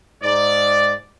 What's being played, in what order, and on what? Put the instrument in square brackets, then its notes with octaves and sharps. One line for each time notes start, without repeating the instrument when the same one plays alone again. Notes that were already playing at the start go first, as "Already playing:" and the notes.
[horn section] G#2 D5